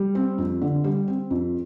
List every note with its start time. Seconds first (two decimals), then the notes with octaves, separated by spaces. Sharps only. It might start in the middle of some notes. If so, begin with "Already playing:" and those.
Already playing: G3
0.15 C4
0.38 F2
0.62 D3
0.84 G3
1.08 C4
1.31 F2